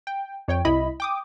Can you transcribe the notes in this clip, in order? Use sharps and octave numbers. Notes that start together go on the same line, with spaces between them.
G5
F2 C#5 G5
C2 E4 D#5 B5
G5 D6 D#6